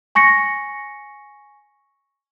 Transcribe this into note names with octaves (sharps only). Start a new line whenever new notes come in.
G#5 C#6 A#6 C#7